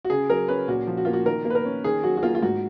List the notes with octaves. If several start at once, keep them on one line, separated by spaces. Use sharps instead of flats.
F#4
C#3 G#4
F#3 A#4
C#4 B4
A#2 F#4
F3
F#4
A#3 F4
F#4
D#3 A#4
A#3
B4
A#4
C#4
D#3 G#4
F#3 F#4
F#4
A#3 F4
F4
G#2 F#4